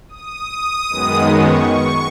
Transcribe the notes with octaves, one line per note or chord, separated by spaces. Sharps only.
D#6
F#2 D#3 G#3 B3
C#6
C#6